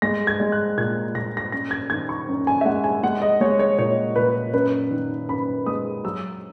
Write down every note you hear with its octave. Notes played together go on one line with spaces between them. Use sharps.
G#3 A#6
G#6
G#3
F#6
A#2 G#6
A#2 A#6
A#6
F#2 A#6
G#6
D#3 G#6
C#6
F#2
G#5
E5
G#3 F#5
G#5
G#3 F#5
D#5
G#3 C#5
C#5
A#2 C#5
A#2 B4
F#2 B4
D#3
F#2 B5
G#3 D#6
F#3 E6